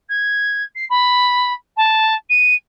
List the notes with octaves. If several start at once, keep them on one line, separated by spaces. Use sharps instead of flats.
G#6
C7
B5
A5
D#7